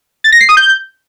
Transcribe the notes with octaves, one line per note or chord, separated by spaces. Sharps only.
A6
A#6
C7
D#6
G6